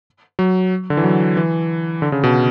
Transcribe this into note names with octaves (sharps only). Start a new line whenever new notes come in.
F#3
D3
E3
F#3
E3
D3
C#3
B2